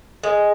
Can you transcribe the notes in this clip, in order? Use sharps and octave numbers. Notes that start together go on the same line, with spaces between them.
G#3